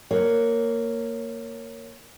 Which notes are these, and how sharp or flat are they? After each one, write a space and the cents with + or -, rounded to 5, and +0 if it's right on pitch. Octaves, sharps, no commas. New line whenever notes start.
A#3 -10 C#5 +0